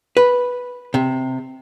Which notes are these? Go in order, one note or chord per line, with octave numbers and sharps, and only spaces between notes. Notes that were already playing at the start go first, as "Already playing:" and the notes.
B4
C3